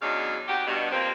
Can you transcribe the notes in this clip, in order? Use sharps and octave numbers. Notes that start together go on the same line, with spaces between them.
E2 C#3 F#3 D4 D#4 F5
C3 D#4 F#4 G4
G2 B2
C3 F3 A#3 C4